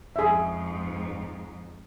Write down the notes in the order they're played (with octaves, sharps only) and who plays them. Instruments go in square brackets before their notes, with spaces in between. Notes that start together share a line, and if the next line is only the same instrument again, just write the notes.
[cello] F2 G#2 [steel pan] G#4 E5